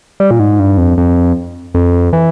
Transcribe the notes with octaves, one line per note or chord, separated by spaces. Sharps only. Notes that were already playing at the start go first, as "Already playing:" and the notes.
G3
A#2
G#2
G2
F2
F2
F2
E3